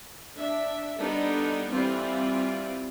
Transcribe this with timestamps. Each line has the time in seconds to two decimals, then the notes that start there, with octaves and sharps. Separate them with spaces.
0.38 D4 E5
0.99 G3 B3 D4 D#4 A4
1.71 E3 G3 C4 F4